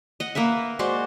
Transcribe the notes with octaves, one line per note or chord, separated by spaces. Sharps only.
D#5 F#5
A#3 A#4 B4 E5
G#3 F#4 C5 D5